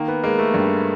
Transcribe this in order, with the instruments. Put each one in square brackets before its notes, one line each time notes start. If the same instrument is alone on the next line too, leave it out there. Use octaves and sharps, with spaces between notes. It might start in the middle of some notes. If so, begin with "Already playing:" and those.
Already playing: [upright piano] D#3 [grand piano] A#3
[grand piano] B3
[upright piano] G#3 [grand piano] A#3
[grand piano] A3
[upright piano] G2